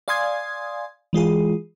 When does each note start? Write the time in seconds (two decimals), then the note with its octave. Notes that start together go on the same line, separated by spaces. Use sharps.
0.08 D5 F5 G#5 C6 D#6 G#6
1.13 E3 G#3 F4 G#4